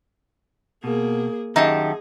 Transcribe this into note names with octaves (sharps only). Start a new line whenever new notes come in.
B2 A#3 G#4
F#2 D#3 D#4 G4 G#4 E5 A5